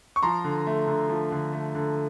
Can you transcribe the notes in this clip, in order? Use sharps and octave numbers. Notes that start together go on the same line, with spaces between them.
C#6
F3 A#5 C6
D3
A3
D3
F3
D3
A3
D3